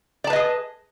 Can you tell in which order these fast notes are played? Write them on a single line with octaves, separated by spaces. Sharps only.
D5 A5 B4 D#5 G#4